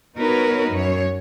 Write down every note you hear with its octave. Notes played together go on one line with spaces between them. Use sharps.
B3 D#4 F#4 A#4 B4 C#5
F#2 C#5